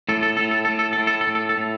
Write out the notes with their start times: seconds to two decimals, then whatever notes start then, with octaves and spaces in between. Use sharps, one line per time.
0.09 A2 A4
0.23 A4
0.37 A2 A4
0.51 A4
0.65 A4
0.68 A2
0.79 A4
0.93 A4
0.97 A2
1.07 A4
1.21 A4
1.27 A2
1.35 A4
1.49 A4
1.57 A2